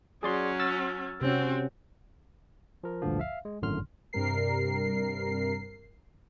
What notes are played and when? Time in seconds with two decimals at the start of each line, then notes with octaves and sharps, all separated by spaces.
0.23 F#3 C#4 G#4 D5 C6
0.60 E6 F6 A6
1.22 C3 C4 C#4 F#4
2.84 F3 A#4
3.02 A1 D2 G2 A#2 D3 F3
3.20 E5 F5
3.45 G#3
3.62 G#1 F#2 A2 D3 C6 F6
4.13 G2 C3 G3 A#4 C7